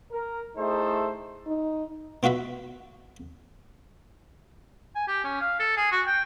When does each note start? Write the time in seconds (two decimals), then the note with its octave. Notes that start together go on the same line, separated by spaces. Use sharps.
0.11 A#4
0.57 A3 D#4 E4 G#4 A4 C5
1.47 D#4
2.23 B2 F4 F#4 E5 B5
4.95 G#5
5.07 G4
5.24 C#4
5.41 F5
5.60 A4
5.77 G#4
5.91 F#4
6.07 G5